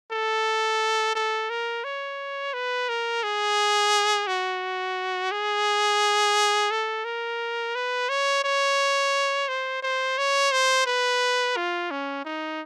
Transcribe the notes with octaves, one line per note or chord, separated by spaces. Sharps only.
A4
A4
A#4
C#5
B4
A#4
G#4
F#4
G#4
A4
A#4
B4
C#5
C#5
C5
C5
C#5
C5
B4
F4
C#4
D#4